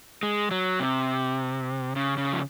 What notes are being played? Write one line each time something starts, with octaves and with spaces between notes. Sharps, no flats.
G#3
F#3
C3
C#3
C#3
F3